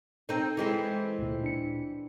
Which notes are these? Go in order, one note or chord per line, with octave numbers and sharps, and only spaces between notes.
C4 D#4 A4
E3 G#3 C4
D2 A#2
D4 C#7